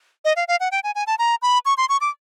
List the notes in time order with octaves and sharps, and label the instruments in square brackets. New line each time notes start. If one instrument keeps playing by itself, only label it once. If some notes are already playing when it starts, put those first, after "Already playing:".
[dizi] D#5
F5
F5
F#5
G5
G#5
G#5
A5
A#5
B5
C#6
C6
C#6
D6